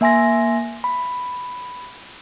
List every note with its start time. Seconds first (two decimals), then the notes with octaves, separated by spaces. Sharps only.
0.01 A#3 E5 G#5 C6 A#6
0.84 B5